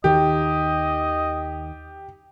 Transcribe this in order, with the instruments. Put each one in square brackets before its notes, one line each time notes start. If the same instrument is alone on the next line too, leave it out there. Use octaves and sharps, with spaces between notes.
[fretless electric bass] D#2 D#3 [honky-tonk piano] G4 [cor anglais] D#5